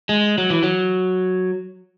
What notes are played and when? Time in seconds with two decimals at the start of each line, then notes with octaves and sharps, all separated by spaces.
0.09 G#3
0.38 F#3
0.50 E3
0.63 F#3